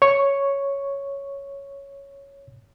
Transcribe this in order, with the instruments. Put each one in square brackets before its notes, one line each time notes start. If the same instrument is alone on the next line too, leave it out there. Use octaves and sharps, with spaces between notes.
[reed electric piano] C#5 C#6